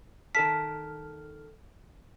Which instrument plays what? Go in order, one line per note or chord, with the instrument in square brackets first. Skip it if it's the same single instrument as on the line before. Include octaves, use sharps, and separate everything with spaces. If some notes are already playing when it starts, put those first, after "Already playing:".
[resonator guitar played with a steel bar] D#3 A#4 A5 [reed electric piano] A4 F6 [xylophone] B6